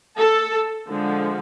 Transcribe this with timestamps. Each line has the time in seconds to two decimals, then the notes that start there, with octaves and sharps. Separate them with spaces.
0.15 A4
0.89 D3 F3 G#3